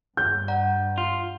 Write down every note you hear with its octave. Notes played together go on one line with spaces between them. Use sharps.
G2 G6
D5 F#5 A#5
F4